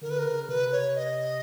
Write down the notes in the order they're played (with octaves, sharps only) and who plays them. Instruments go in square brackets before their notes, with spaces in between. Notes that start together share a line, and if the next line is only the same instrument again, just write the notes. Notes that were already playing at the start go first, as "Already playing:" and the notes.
[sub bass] D3 [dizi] A#4
[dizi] B4
A#4
[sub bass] C#3
[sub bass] C3 [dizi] B4
[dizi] C#5
D#5